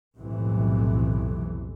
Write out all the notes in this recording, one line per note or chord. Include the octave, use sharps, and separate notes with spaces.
B1 F2 A2 C3 E3